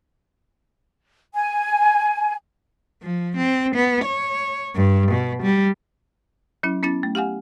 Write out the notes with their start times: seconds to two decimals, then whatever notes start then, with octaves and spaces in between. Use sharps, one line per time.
1.34 G#5
3.03 F3
3.36 C4
3.75 B3
4.04 C#5
4.75 G2
5.11 B2
5.43 G3
6.63 F#3 C#4 E4
6.83 B3 C#4 E4 A6
7.03 A3
7.15 G4 F5 F#5 G#5